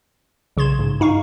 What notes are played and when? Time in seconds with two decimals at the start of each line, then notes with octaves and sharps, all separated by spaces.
0.57 B1 C#3 C6 G#6 E7
0.79 G#2 C#3
1.00 G2 D#4 F5 C#6